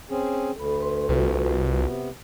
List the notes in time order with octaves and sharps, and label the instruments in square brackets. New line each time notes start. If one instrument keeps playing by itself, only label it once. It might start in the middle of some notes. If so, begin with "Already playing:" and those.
[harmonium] C4 C#4 G#4
[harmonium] D2 [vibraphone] A4 B5
[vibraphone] B4 C6
[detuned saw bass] C2 [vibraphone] F4 F#4 B4
[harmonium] C3 B3